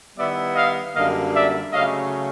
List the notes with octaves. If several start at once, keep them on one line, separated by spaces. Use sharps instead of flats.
D#3 G3 B3 E4 D5 E5
D#5 F5
F#2 D3 G3 A#3 D#5 F5
D5 E5
C#3 F#3 A3 D#5 F5